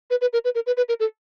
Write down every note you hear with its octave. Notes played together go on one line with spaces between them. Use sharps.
B4
B4
A#4
B4
A#4
B4
B4
A#4
A4